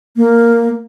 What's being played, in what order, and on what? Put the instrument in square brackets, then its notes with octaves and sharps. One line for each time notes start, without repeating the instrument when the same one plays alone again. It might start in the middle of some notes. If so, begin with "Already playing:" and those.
[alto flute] A#3